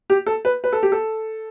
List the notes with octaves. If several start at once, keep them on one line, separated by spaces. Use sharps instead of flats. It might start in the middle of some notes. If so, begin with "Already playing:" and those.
G4
A4
B4
B4
A4
G4
A4